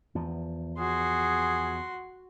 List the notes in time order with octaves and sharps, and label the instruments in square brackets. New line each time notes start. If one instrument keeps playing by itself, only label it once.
[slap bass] E2 F3
[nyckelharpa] F#4 C6 [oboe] G#4